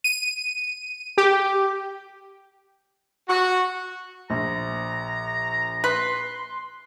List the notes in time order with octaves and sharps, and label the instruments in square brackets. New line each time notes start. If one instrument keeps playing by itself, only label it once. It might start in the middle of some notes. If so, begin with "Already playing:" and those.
[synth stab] D#7
G4
[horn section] F#4
[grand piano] A#1 [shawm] A#5
[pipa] B4 [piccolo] C6